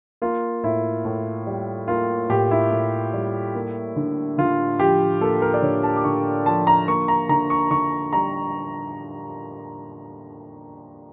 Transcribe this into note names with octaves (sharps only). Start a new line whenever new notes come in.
A#3 F4
A2 E4
A2
G3
A#3 F4
A2 G4
E4
A2
G3
A#3
D3
D3 F4
F3 G4
A#3 A4
A#4
D5
D3 C#5
A5
D6
D3 C#6
F3 A5
A#5
A#3 C#6
A#5
D3 A#5
C#6
D3 C#6
G3 A#5